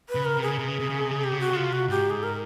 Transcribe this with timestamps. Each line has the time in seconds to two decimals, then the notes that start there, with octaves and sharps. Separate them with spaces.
0.09 B4
0.15 C#3
0.25 A#4
0.37 C3
0.42 G#4
0.48 C#3
0.58 C3
0.68 C#3
0.79 C3
0.90 C#3
1.01 C3
1.11 C#3
1.21 C3 G4
1.32 C#3
1.40 C3 F#4
1.53 C#3 F4
1.64 C3
1.73 F#4
1.88 G#2 G4
2.10 G#4
2.23 A#4